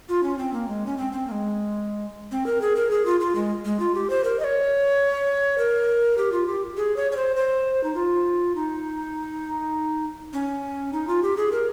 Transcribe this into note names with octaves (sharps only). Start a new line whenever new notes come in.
F4
C#4
C4
A#3
G#3
C#4
C4
C4
A#3
G#3
C4
A#4
G#4
A#4
G#4
F4
F4
G#3
G#3
F4
G4
C5
A#4
D#5
C#5
A#4
G4
F4
G4
G#4
C#5
C#5
C5
C5
D#4
F4
D#4
C#4
D#4
F4
G4
G#4
A#4